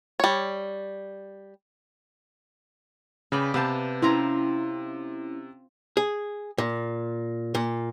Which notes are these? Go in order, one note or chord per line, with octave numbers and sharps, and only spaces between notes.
G3 C#5
C#3 B4 D5 G5
C3 B3 F5 A5 G6
C4 C#4 E4 F4 A#5
G#4
A#2
A#2